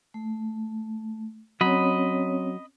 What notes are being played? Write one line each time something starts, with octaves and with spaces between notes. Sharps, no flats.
A3
F#3 C4 C#4 C#5 D#5 B5